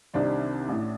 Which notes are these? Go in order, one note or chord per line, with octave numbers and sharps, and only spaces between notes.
C2 C3 D#3 D4
A1 A2